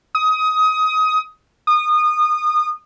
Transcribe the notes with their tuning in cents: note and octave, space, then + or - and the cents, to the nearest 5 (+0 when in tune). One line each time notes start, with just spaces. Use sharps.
D#6 +20
D#6 -25